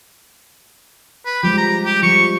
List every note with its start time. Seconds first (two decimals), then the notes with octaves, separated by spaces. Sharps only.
1.26 B4
1.43 F3 G3 G#3 G4
1.57 A#5
1.85 G4
2.03 F3 G3 C#6